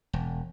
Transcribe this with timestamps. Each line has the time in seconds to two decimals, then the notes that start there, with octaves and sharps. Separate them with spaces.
0.13 E1